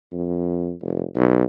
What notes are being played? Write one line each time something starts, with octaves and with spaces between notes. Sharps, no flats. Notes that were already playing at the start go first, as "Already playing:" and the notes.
F2
F1
B1